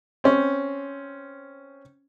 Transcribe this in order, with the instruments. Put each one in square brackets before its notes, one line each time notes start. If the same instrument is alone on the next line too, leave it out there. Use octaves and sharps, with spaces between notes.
[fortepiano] C4 C#4